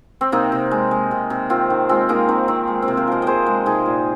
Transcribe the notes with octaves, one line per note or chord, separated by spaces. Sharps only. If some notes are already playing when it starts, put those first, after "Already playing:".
C4
C3 A#3 D#4
C3
G#3
G#3
C3
C3
D#3 C4 F4
D#3
G#3 C4 F4
G#3 A#3 D#4
D#3 C4
D#3 C4
G#3
C4
C3
F4 A#4
F3 A#4 D#5
C3 G#4 C5 D#5
G#3
C3 D#4 G#4
A#2